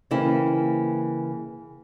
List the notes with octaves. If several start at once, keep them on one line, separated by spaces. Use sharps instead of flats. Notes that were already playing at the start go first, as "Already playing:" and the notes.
C#3 E3 A#3 C4 E4